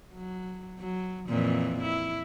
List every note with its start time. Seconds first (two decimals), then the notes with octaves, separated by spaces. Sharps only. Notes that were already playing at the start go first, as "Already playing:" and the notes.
0.14 F#3
0.79 F#3
1.29 F2 A#2 E3
1.82 E4